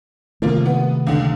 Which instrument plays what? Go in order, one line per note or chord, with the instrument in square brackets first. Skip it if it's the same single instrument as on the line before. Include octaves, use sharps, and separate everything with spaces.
[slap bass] C3 D#3 A3 [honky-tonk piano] F3 A#3 F4
[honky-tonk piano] B3
C#2 D3